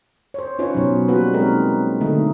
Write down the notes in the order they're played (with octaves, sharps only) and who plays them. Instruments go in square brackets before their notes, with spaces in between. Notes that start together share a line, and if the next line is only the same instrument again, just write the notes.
[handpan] C5 C#5
C#4 D#4 F4 B4 C#5
B2 F#3
G3 A#3 F4 F#4 B4
G#3 C4 D#4 A#4
D3 A3 D#4